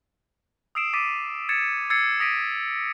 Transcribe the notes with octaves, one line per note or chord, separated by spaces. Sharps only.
D#6 E6 C7 D7 E7
D6 A6 B6 C7 D7 D#7
G#6 A6 C#7 E7
E6 G#6 A6 C7 C#7 D#7
D#6 A#6 B6 D7 D#7